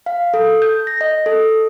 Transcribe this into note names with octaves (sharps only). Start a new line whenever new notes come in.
F5
A4
G6
A#6
D#5
A4